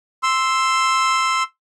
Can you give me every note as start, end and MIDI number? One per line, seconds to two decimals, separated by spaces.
0.23 1.43 84
0.23 1.43 88